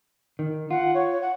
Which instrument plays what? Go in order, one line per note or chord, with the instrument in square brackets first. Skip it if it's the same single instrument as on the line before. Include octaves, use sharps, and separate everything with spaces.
[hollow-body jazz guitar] D#3
[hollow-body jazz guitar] F4 [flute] F#5
[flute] C#5
F#5